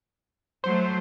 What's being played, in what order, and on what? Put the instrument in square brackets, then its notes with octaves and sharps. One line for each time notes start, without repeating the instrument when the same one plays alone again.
[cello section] F#3 A3 [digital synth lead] C5